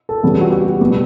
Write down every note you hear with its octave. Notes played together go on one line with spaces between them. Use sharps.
A4
E2 C#3 G3 B3
F#4
G4
G4
B2 G3 B3 G4